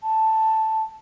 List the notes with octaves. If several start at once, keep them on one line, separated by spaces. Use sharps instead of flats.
A5